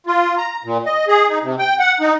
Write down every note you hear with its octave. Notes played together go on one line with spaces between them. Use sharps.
F4
A#5
A#2
D#5
G#4
D#4
C3
G5
F#5
D#4